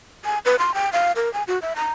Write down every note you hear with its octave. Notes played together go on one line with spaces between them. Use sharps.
G#5
B4
C6
G5
F5
A#4
G#5
F#4
E5
A#5